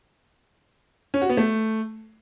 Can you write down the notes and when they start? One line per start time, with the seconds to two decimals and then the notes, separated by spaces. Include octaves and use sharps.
1.14 C#4
1.22 F#4
1.29 B3
1.37 A3